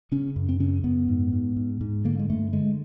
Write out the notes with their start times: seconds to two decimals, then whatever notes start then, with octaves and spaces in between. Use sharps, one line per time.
0.12 C#3 C#4
0.36 F#2
0.49 C4
0.60 C#3 C#4
0.84 F#2 B3
1.08 G#2
1.32 G#2
1.56 G#2
1.81 G#2
2.05 D3 A#3
2.19 G#3
2.30 G2 A3
2.53 D3 G#3